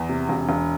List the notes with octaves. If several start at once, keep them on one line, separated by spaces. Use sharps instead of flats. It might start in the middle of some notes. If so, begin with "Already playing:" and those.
Already playing: E2
C3
E1
E1